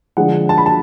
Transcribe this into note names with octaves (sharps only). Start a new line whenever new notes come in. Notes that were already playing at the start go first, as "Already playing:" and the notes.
D3 F3 G#3 F#5
A5
B5
A5